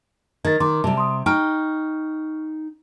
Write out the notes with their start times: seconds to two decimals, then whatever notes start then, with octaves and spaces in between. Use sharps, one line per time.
0.45 D#3 G#6 A6
0.60 D#3 C6 D6
0.84 C3 G3 A5
0.97 C6 D#6
1.26 D#4 G5 C#6 F6